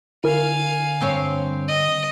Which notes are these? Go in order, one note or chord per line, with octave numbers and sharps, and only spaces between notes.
D3 E4 A#4 F5 G#5
G2 C4 C#5
D#5